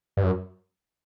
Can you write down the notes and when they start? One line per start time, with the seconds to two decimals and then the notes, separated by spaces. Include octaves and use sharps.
0.17 G2
0.23 F#2